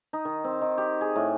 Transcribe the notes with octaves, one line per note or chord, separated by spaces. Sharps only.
D#4
D#3
C4
D#3
G4
G#4
A2